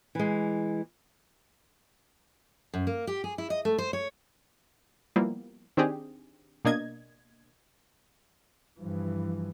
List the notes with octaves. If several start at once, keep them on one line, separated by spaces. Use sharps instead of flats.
E3 G#3
F#2
A#3
G4
G#4
E4
D#5
A3
C5
C#5
F3 G3 A#3 B3 E4
D#3 C4 D4 G4 G#4
B2 A#3 D4 D#5 G#6
G2 E3 F3